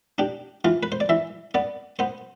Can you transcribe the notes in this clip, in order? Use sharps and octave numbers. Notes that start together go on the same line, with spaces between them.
D4 G4
E3 F4
B4
C5
D5
E3 E5
B3 D5
B3 C5